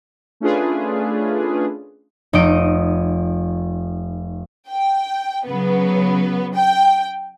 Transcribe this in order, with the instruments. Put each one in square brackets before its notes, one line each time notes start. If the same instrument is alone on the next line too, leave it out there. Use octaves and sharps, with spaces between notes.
[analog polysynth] A3 C#4 D4 F4 G#4 B4
[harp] F1 D#4 D#5 D7 D#7
[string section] G5
C#3 F#3 B3
G5